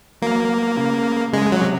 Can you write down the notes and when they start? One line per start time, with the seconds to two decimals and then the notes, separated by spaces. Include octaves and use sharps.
0.22 F#3 A#3
0.77 C#3
1.33 C#3 G#3
1.52 F#3
1.61 C3